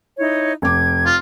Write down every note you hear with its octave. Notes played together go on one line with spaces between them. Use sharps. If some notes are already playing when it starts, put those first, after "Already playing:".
D#4 E4 C#5
F1 D6 G#6
F4